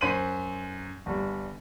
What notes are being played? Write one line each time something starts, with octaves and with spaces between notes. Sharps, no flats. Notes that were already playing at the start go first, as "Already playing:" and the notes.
F#2 C5 C6 B6 D#7 F#7
G1 G3